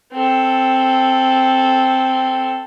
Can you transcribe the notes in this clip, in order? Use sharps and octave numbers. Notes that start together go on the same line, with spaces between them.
C4 A4